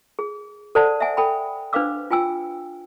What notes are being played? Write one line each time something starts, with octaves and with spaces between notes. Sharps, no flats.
G#4
A4 C5 D5 F#5 A5
E5 F#5 G#5
A4 G5 B5
D4 B4 C5 F5 D6 E6
F4 G5 G#5 E6